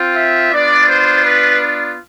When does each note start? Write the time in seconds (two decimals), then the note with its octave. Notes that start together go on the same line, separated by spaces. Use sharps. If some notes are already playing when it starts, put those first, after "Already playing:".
Already playing: C4 F4
0.17 E5
0.52 B3 D4 F4 D5
0.89 C5
1.25 B4